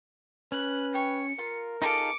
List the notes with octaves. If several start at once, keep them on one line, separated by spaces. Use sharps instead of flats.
C#4 B4 F#6
C#5 G5 C#7
F4 A#4
D#4 F4 G#4 A4 F5 D6 C#7